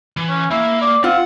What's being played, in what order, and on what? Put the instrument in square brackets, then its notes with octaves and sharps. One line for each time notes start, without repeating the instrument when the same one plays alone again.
[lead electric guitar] E3
[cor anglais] C#4
[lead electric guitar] A#3 [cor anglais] E4
[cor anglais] D5
[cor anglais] C4 [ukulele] F4 [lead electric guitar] F#5